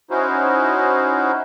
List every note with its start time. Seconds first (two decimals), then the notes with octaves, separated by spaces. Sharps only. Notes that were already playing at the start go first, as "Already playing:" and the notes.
0.10 C#4 D#4 E4 F#4 C5